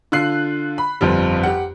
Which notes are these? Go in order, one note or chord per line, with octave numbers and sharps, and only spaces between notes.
D3 F4 F#6 C7
B5
G1 F2 F3 G3
G4 F#5